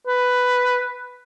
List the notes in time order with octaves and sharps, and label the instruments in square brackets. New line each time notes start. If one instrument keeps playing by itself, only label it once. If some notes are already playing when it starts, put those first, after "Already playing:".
[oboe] B4